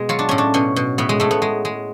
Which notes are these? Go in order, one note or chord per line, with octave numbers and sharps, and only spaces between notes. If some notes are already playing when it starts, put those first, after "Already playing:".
Already playing: B2 G#3
F#3 F4
D4
A2 C#4
D4
B2 C#4
B2
A2 B3
G#3
A2 A3
B3
G#3
G#3